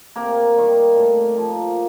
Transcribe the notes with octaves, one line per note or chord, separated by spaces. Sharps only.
C3 A#3 A#4
D#3 G3
A2
F3 A#3